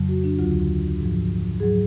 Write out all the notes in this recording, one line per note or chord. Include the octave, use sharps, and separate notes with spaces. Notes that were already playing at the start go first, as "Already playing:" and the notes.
Already playing: F2 C#3 F#3
F#4
D4
D2 D3 F#3 F4
G#2 F3
G#2 F#3 G#4